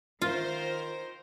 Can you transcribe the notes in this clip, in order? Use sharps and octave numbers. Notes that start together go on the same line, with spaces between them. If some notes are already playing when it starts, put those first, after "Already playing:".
D#3 F4 A#4 C5